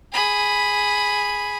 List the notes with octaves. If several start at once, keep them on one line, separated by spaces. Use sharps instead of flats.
G#4 B5